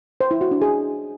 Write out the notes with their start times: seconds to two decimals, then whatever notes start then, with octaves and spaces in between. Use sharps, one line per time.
0.21 C5
0.31 E4
0.41 F#4
0.51 D4
0.62 G#4